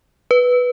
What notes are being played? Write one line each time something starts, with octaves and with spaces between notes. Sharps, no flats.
B4